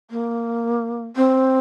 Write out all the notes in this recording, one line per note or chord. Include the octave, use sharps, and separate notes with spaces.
A#3
C4